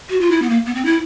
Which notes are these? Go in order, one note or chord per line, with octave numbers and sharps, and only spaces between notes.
F#4
F4
E4
B3
A#3
B3
C4
E4